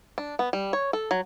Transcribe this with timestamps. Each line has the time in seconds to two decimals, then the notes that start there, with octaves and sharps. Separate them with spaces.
0.18 D4
0.39 B3
0.53 G3
0.73 C#5
0.93 A4
1.11 F#3